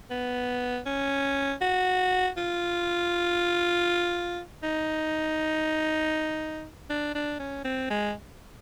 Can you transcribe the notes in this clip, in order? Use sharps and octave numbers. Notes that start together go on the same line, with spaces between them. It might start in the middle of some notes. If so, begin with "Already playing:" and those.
B3
C#4
F#4
F4
D#4
D4
D4
C#4
C4
G#3